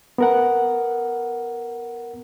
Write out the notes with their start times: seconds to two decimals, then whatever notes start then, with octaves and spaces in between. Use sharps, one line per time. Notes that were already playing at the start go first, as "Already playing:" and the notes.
0.18 B3 A#4 F#5